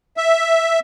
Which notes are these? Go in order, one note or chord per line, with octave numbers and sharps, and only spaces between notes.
E5